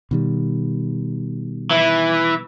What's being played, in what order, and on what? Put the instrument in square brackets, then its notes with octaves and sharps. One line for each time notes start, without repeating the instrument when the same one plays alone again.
[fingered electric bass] B2 D#3 G3
[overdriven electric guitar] E3